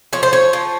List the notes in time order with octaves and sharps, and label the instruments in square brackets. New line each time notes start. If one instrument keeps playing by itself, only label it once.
[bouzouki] F3 C#5
C5
C#5
F3